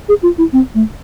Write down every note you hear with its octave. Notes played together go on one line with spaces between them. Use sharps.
G#4
F4
E4
C4
A3